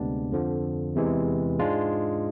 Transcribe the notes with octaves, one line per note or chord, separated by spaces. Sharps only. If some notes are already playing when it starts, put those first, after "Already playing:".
Already playing: D2 C3 G#3 B3 D4
F2 D3 F3
E2 C3 E3 G#3
G#2 G#3 D4 F4